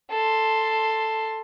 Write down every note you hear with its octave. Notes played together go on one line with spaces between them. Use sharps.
A4 C6